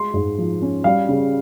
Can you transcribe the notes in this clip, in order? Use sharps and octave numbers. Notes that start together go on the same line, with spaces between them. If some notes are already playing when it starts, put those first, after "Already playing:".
Already playing: G#3 C6
G#2
F3
C#4
G3 F5
C#3